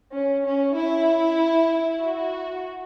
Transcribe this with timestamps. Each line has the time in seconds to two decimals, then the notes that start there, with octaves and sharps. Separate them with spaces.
0.14 C#4
0.45 C#4
0.76 E4
2.00 F#4